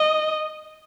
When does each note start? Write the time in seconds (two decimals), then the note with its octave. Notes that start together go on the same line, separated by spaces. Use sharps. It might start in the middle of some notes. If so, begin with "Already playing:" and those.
Already playing: D#5